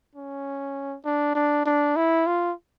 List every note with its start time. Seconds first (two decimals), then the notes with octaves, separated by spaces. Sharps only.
0.15 C#4
1.05 D4
1.35 D4
1.66 D4
1.96 E4
2.27 F4